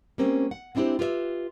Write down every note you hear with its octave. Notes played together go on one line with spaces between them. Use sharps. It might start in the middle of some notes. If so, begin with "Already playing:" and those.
G3 A3 A#3 C4 C#4
F#5
G#3 C4 D4 E4 G4 C5
F4 G4 B4 D5 E5